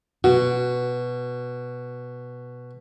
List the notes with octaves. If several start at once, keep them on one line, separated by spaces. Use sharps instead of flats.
B2 F#4